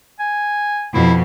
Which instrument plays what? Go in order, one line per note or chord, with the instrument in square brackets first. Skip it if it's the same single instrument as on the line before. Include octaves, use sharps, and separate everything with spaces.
[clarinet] G#5
[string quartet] F2 B2 [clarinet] E4